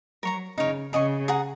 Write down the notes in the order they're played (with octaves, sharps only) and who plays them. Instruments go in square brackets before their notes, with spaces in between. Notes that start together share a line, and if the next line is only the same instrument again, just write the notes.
[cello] F#3 [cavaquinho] A#4 C#5 A#5
[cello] C#3 [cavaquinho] D#4 A#4 C#5
[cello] C#3 [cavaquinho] G#4 D#5 G#5 C#6
[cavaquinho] G#4 F#5 A#5